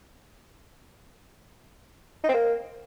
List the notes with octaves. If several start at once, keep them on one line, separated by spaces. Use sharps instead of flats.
D#4
C4
A#3